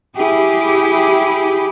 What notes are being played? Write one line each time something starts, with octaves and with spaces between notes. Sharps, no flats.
E4 G4 G#4